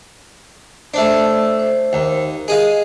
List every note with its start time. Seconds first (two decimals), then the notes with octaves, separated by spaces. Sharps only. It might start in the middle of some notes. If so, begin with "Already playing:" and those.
0.94 A3 D4 C5 E6
1.59 C5
1.93 D#2
2.48 G#4 D#5 F5